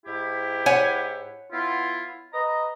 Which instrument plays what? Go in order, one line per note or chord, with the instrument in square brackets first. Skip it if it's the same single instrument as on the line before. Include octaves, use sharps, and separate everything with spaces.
[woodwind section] G#2 E4 G4
[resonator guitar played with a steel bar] C#5 F#5 G#5
[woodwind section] B3 E4 F4
B4 D#5 A#5